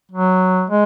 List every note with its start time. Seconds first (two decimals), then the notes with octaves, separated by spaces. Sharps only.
0.11 F#3
0.70 G#3